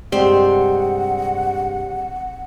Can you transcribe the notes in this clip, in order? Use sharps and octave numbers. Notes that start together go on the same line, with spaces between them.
G2 C3 G#3 C4 G4 D5 F#5